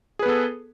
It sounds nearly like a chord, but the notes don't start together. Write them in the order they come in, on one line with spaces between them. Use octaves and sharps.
G#4 B4 B3 A4